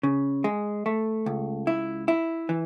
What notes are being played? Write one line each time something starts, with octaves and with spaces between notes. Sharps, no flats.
C#3
G#3
A3
C#2
E4
E4
E3